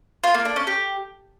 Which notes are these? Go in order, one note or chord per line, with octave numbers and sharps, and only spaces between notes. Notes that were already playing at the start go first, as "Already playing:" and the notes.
F4
A#3
D4
C#4
G4